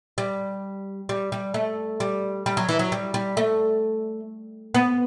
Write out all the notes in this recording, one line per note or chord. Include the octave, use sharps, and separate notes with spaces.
G3
G3
G3
A3
G3
G3
F#3
E3
F#3
G3
G3
A3
B3